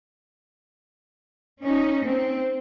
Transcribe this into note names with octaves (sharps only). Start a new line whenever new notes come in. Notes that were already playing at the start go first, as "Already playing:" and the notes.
C#4 D#4
C4